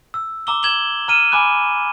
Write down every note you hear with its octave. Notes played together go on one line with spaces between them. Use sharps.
E6
A#5 D6 E6 G7
G#6 E7 F#7 G7
A#5 F6 D#7 E7
G#5 B5 D6 F#6